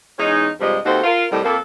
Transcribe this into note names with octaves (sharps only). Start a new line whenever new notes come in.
E2 G#3 C#4 D#4
G2 C3 F3 G3 G#3 D#5
D#2 C4 D#4 F#4 A4 C5
F4 A#4
A2 C3 D#3 G3
F2 A#3 A4